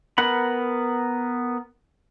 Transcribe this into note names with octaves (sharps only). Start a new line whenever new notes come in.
B3 A#4 F#5 B5